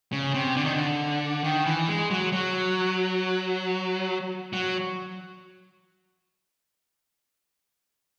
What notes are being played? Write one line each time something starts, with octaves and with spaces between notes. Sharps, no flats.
C#3
C3
D3
D#3
D3
D#3
E3
G#3
F#3
F#3
F#3